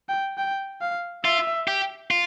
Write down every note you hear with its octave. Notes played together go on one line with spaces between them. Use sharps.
G5
G5
F5
F4 E5
G4
F4